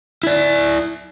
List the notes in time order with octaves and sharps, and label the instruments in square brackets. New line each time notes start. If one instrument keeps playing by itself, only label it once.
[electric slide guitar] E4 D5